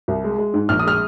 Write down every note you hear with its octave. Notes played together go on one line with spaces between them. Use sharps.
C2
G#3
G#3
G#2
A#1 F6
D#6
G#3 F6